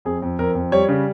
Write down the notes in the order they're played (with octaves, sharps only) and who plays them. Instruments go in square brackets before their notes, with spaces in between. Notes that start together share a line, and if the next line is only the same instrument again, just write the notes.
[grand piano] F2 G#4
F2
F2 A#4
F2
G3 C#5
C#3